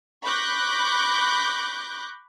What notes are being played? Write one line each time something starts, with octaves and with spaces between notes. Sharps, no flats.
B5 C#6 D6 F#6 G6 A#6